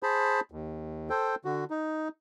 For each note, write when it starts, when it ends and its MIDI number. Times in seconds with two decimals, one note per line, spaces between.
0.03 0.40 68
0.03 0.40 72
0.03 0.40 81
0.03 0.40 83
0.51 1.10 39
1.10 1.35 69
1.10 1.35 72
1.10 1.35 79
1.45 1.64 50
1.45 1.64 66
1.70 2.08 63